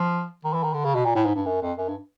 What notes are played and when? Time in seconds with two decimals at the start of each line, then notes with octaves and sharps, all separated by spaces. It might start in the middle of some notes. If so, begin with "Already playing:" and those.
Already playing: F3
0.44 D#3
0.53 E3
0.63 D#3
0.74 D3
0.84 C#3
0.95 B2
1.05 A#2
1.15 A2
1.25 G#2
1.36 G2
1.46 F#2
1.62 F2
1.78 F#2
1.88 G2